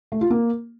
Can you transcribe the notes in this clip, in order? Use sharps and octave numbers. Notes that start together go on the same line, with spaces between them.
A3
F4
A#3